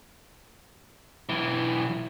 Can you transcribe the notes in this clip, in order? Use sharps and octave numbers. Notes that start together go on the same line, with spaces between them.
B1 E3